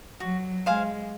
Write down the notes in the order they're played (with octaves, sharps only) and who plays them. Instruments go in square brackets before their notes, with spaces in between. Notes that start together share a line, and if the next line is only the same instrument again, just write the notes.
[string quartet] F#3 [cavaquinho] F#4
[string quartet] G#3 [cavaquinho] C5 F5 G#5